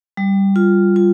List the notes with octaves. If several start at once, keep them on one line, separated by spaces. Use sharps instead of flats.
G3
F4
F4